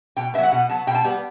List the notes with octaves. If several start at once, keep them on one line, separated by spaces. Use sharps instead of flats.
B2 G5
F#3 B3 E5 F#5
B2 F#5
F#3 B3 A5
B2 G5
A5
G3 B3 G5